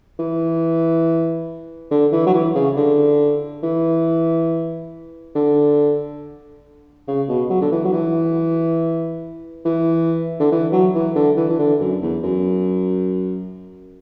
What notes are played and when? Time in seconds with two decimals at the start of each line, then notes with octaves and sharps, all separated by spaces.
0.19 E3
1.91 D3
2.12 E3
2.27 F#3
2.34 E3
2.55 C#3
2.77 D3
3.63 E3
5.35 D3
7.08 C#3
7.29 B2
7.50 F#3
7.61 D3
7.72 E3
7.85 F#3
7.93 E3
9.65 E3
10.40 D3
10.52 E3
10.72 F#3
10.95 E3
11.16 D3
11.37 E3
11.49 E3
11.59 D3
11.80 F#2
12.02 E2
12.23 F#2